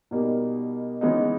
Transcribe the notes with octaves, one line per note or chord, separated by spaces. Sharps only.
B2 G3 A#3 D#4
C#3 E3 G#3 B3 D#4